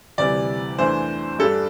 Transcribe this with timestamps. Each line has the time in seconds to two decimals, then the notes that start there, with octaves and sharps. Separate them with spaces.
0.18 D2 C3 E3 G3 D5
0.79 E2 E3 A3 D4 C5
1.39 G2 G3 D4 A4